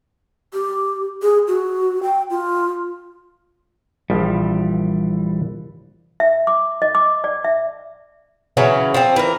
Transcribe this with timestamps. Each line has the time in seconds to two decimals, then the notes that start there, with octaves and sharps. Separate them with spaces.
0.53 G4
1.22 G#4
1.48 F#4
2.03 G5
2.30 F4
4.10 A#1 E3 F3 G3
6.20 E5
6.47 D6
6.82 D#5
6.95 D6
7.24 D5
7.44 E5
8.57 C#3 E3 F#3 C#4
8.94 F3 C4
9.16 E3 A#4